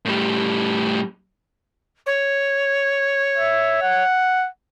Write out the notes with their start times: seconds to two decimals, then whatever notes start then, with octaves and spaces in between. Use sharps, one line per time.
0.05 A2 G3
2.06 C#5
3.37 E5
3.82 F#5